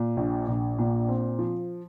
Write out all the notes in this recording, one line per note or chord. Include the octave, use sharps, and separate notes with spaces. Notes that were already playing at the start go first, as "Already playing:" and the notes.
Already playing: A#2
A#1
A#1
A#2
C4
F3